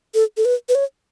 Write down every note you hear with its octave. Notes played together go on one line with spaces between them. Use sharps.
A4
A4
B4
B4
C#5